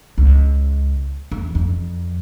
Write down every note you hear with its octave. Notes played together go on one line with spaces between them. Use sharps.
C#2
E2
F2